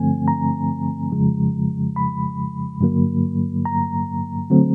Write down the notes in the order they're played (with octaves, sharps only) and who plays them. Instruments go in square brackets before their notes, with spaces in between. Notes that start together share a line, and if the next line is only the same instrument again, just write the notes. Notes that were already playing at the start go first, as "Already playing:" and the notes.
Already playing: [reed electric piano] G2 D3 F3 A3 C4 G#5
A#5
F2 C#3 F3 G#3
B5
G2 D3 F#3 A#3
A#5
D3 F#3 A3 C4